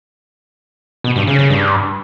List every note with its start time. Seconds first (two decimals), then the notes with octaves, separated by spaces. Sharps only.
1.04 B2
1.16 G2
1.27 C#3
1.39 C#3
1.50 G2